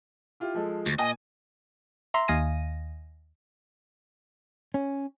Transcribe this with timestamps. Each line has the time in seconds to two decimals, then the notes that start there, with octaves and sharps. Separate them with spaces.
0.40 E4 F4 G4
0.54 F3 G#3 A4
0.86 D2
0.98 A#2 D#5 G#5
2.14 E5 A#5 C6
2.28 D#2 D#5 F5 G#5 A#6 D#7
4.74 C#4